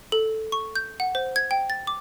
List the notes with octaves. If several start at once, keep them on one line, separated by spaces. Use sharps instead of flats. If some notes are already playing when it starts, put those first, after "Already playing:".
A4
C#6
G6
F#5
C5
G#6
G5
A6
D6